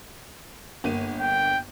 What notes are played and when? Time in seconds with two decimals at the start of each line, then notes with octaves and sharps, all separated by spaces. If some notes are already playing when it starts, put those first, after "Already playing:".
0.84 G1 A#3 D#7
1.20 G5